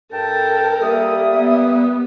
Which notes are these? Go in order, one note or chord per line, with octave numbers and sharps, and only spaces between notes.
G2 A4 A#4 G5 A5
G3 A#3 E5 D#6
B3